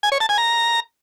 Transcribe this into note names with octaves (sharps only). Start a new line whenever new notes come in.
G#5
C#5
A5
G#5
A#5